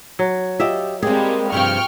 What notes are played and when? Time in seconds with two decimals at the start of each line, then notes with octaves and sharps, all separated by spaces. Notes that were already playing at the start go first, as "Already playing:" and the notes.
0.19 F#3
0.60 F4 G4 D#5 E5
1.03 G3 G#3 A#3 C4 G4 G#4
1.52 G2 C3 F3 G5 C#6 F6